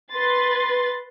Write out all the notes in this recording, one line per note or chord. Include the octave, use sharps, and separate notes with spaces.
B4 C6 A6